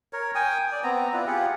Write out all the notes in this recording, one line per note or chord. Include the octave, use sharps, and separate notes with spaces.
A#4 C#5
G5 G#5 D#6
D5
B3 C4 A#5
E4 F4 B4 D5
F4 G4 G#4 F#5